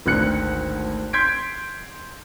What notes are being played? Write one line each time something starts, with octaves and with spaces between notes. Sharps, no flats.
G#1 D2 D3 F#6 C#7
C6 G6 G#6 B6 D7